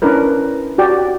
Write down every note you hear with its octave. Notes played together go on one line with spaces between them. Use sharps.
C#4 D4 E4 A#4 B4
F#4 G4 D5 G5